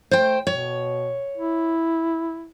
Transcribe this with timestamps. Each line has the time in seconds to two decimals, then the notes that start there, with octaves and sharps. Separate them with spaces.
0.11 A3 C5 G5
0.47 B2 C#5
1.37 E4